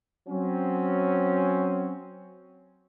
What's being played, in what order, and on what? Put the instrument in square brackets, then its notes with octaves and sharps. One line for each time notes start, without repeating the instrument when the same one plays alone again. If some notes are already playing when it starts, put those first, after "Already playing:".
[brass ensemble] F#3 C4 C#4